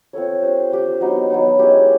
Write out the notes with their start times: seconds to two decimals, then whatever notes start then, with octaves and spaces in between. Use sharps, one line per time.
0.13 C4 F4 A4 C#5
0.43 D4 G4 C5
0.72 D4 G4 C5
1.01 F#3 B3 D#4
1.30 F#3 B3 D#4
1.59 G#3 C#4 E4 G4